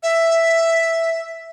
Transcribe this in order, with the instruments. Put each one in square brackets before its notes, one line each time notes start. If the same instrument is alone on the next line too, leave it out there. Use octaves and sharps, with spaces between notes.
[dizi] E5